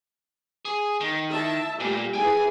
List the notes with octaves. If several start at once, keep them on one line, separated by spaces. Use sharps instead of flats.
G#4
D#3
E4 E5 A5
A#2 G3 A3 G4
E3 E4 G#4 G5 G#5